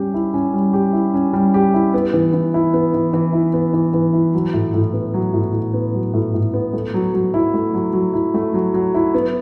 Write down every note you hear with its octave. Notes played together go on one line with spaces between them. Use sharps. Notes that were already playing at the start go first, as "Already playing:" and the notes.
Already playing: G3 C#4 G4
E4
C#4
G3
G4
E4
C#4
G3
G4
E4
B3
E3
E3
E4
B3
E3
E3
E4
B3
E3
E3
E4
F#3
A2
A2
B3
F#3
A2
A2
B3
F#3
A2
A2
B3
A3
F#3
F#3
E4
A3
F#3
F#3
E4
A3
F#3
F#3
E4
B3